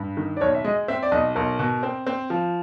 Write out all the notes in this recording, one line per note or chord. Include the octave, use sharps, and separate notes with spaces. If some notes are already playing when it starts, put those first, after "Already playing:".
Already playing: G2
D#3
D5
B1 C#5
E5
G#3 D#5
C4 E5
D5
B1 D#5
B1 A#4
B2
C4
C4
F3